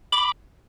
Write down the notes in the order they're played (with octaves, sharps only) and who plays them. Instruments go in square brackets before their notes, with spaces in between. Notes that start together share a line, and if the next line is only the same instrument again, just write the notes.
[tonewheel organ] B5 D6